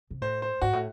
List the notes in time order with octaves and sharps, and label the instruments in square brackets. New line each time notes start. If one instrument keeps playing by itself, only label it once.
[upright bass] C3
[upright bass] A2 [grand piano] C5
[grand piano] C5
[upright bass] G#2 [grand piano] F#4
[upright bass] A2